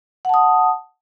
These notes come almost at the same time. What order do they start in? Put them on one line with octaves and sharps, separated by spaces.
F#5 A5 D#6